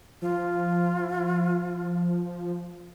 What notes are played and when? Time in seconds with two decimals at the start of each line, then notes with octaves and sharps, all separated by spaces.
0.22 F3 F4